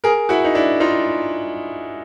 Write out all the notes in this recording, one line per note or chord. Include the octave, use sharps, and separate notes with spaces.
G#4 A#4
E4 F#4
D#4
D4 E4
D#4 F4